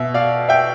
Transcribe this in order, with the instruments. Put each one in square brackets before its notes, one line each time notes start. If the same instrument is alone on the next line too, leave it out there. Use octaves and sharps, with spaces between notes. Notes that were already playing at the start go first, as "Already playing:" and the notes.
Already playing: [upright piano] B2 E5
D5 F5
E5 G5